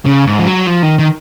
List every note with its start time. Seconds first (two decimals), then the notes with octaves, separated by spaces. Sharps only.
0.05 C#3
0.26 G#2
0.39 F3
0.47 F#3
0.67 F3
0.83 D#3
0.98 D#3